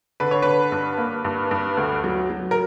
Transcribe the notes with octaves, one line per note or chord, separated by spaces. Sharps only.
D3 B4
C#5
D3 B4
G2
A#3
G2
G2
D2
F#3
F#3
A#4